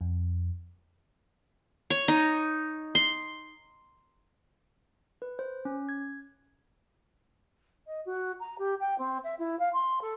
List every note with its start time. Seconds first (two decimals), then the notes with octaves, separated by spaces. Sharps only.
0.01 F2
1.90 C#5
2.08 D#4
2.95 C6
5.22 B4
5.39 C5
5.65 C#4
5.89 G#6
7.86 D#5
8.05 F#4
8.40 A#5
8.58 G4
8.79 G5
8.98 C4
9.23 E5
9.38 E4
9.59 F5
9.73 C6
10.01 A4